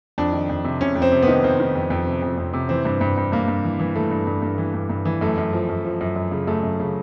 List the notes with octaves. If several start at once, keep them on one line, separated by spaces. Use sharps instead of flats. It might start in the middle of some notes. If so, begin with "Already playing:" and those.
F2 D4
D#3
F2
C3
C3 C#4
F2
C4
C3
B3
D#3
D#3 C4
D#3
F2
F2
C3
F2
F2
C3
E3 C4
G2
G2
G2
G2 A#3
G2
E3
E3
E3 A3
G2
G2
G2
E3
G2
G2
E3
F#2 A3
F#2
F3
F#2
F3
F#2
F#2
C#3
F#2 A3
F#2
C#3